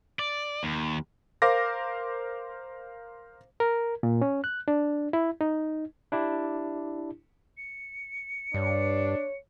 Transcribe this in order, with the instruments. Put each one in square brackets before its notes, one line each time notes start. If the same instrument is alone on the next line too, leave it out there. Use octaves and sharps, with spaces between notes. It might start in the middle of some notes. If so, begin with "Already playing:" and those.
[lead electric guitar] D5
D#2
[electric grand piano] A#4 C5 F5 D6 A#6
[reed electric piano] A#4
A#2
C#4
F#6
D4
E4
D#4
[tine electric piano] D4 E4 G4
[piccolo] C#7
[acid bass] G2 [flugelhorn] D4 [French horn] C#5